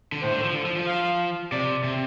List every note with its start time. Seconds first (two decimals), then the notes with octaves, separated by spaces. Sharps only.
0.12 D3
0.22 A2 C5
0.33 D3
0.44 F3
0.54 D3
0.66 F3
0.76 F3
0.87 F5
1.52 C3 D5
1.84 C3